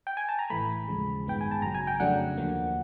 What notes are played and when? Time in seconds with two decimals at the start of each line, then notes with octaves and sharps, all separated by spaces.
0.07 G5
0.17 G#5
0.29 A5
0.39 A#5
0.50 A1 A2 E3 A3 B5
0.87 D#2 C#3 F3 G#3
1.25 A1 G2 D#3 G#3 B3 G5
1.41 G#5
1.51 A5
1.62 G#1 F#2 C#3 F#3 A#5
1.74 G#5
1.87 G5
2.00 F2 C#3 F#3 A3 D4 F#5
2.37 D#2 D3 F3 A#3